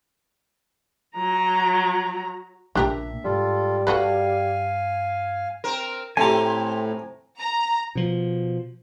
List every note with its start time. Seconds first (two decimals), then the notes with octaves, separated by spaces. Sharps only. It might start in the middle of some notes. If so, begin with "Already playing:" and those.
1.16 F#3 A#5
2.75 A#1 C#3 D4 G4 A#4 E5
3.24 G#2 G3 F4 A4
3.87 G2 F#4 A4 B4 F5 G#5
5.64 C4 A#4
6.17 A2 A3 C4 G4 G#5 A#5
7.41 A#5
7.95 B2 F3